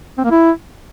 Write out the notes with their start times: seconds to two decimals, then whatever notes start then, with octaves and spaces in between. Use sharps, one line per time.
0.18 C4
0.24 A#3
0.31 E4